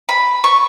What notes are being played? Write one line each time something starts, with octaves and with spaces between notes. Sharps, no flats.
B5
C#6